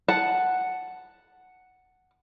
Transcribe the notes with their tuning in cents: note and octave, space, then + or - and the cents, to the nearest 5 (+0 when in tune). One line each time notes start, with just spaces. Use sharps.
F#5 +0 A5 +0